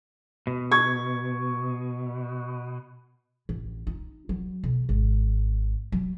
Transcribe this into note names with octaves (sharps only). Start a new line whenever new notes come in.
B2
C#6 G#6
A1
D#4
F#3
B1
G#1
F#3